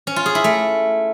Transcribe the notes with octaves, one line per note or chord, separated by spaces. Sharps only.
C#4
F4
G#4
E4
A3